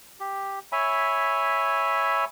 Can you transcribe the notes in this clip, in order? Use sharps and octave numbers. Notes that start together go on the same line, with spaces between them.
G4
C#5 E5 G#5 B5